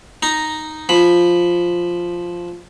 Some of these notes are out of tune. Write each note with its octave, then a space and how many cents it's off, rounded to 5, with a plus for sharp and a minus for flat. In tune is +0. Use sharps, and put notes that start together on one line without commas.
D#4 +0 A#5 +0
F3 +0 B5 +0